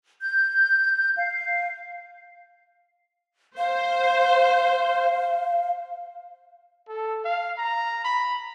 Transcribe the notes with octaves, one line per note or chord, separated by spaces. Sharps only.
G6
F5
C5 F5
A4
F5
A#5
B5